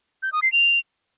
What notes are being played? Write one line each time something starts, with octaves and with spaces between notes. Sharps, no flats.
G6
D#6
C7
F7